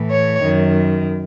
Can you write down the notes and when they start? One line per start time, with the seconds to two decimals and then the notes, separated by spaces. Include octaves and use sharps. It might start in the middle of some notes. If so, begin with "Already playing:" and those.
Already playing: A2 E3
0.11 C#5
0.42 F#2 D#3